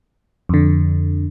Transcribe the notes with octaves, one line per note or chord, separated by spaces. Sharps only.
F2 D3